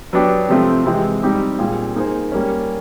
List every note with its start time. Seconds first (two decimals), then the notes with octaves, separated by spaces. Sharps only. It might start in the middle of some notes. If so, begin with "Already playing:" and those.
0.13 F#3 B3 D4 G4
0.49 C3 F3 A3 C4
0.86 C3 E3 G#3 C4 E4
1.23 G3 C4 D#4 G4
1.58 A#2 G3 C4 F4 G#4
1.95 A#3 D#4 G#4 C5
2.32 G3 A#3 C#4